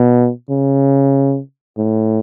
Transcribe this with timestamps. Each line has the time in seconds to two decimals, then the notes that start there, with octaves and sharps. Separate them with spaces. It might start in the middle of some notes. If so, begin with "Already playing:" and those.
Already playing: B2
0.50 C#3
1.78 A2